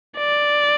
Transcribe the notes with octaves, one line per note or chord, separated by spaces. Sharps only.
D5